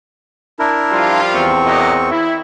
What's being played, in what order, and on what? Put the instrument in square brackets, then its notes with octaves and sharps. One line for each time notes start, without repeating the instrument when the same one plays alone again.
[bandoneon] D4 E4 A#4
[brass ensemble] F3 G3 F4
[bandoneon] E2 C4 C#6
[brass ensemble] F#2 A#2 D#5
E4